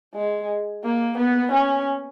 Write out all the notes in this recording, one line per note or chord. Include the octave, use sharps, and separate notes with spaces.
G#3
A#3
B3
C#4